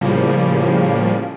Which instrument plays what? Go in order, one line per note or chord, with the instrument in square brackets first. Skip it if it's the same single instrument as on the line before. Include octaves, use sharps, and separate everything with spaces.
[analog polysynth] A2 C#3 F3 G3 A#3